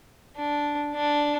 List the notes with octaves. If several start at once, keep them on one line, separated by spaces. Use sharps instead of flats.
D4
D4